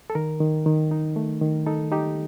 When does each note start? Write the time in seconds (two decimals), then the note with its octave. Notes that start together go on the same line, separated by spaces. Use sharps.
0.10 A4
0.15 D#3 A#4
0.40 D#3
0.66 D#3
0.91 D#4
1.16 A3
1.41 D#3
1.67 D#4 A4
1.92 D#4 G4